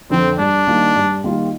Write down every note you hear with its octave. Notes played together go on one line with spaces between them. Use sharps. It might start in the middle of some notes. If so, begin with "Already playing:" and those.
F2 D3 F3 C4
G2 D4
D#3 G3 A#3 F4
G2
D#3 G3 A#3 F4